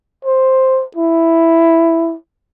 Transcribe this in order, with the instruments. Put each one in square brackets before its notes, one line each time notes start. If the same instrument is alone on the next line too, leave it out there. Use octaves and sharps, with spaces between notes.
[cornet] C5
E4